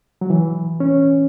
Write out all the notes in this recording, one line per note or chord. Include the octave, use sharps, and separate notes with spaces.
F#3
E3
C#4